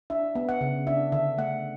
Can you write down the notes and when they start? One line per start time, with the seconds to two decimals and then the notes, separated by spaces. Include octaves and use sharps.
0.10 D4 E5
0.35 B3
0.49 F#5
0.61 C#3
0.87 D4 E5
1.12 D3 E5
1.38 A3 F#5